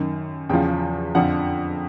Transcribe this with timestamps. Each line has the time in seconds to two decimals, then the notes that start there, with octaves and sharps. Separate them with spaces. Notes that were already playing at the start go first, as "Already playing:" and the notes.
Already playing: F#2 D#3
0.49 E2 C#3 F3 G5
1.15 F2 D3 F3 F#5